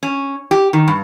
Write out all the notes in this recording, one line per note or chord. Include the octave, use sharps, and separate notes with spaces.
C#4
G4
D#3
G2